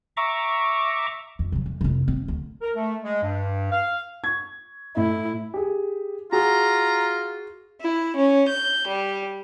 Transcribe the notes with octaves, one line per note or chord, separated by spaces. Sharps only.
E5 A#5 C#6 D6
F2
C3 F#3
F2
F1 E4
C4
A1 D2
A#4
A3
G#3
G2
F5
C#6 G#6
A2 E4
G4 G#4
F4 F#4 G#4 A#5
E4
C#4
G6
G3